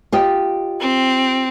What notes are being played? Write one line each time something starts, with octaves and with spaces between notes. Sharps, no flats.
F4 G4 D#5
C4